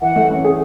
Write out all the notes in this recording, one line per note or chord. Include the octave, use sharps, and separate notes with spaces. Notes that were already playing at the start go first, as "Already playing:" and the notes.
E3 F#5
A3
C#4
G#4